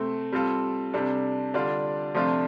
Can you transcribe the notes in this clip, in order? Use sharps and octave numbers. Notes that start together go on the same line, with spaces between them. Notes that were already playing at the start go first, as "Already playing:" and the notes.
Already playing: C3 A3 C4 A4
G3 C4 F4 A4
C3 G3 D4 A4
D3 G3 D4 F4 D5
C3 F3 A3 D4 F4